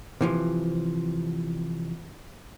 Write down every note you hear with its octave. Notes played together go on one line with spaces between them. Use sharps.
C3 E3 F3